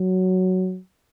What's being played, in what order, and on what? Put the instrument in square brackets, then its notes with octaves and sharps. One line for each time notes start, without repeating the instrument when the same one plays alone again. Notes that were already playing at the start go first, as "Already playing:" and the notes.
Already playing: [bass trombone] F#3